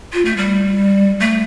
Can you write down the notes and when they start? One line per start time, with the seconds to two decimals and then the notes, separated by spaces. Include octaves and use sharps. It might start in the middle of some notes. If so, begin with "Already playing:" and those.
0.13 F4
0.25 A3
0.37 G3
1.20 A3